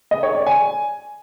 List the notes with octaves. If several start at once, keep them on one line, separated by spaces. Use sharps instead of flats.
D#5
C#5
D5
G#5